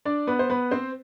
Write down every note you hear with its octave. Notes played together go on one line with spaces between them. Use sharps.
D4 D5
B3 B4
C5
B3 B4
C4 C5